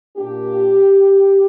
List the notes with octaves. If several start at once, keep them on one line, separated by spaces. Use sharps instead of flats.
A#2 A#3 D4 G4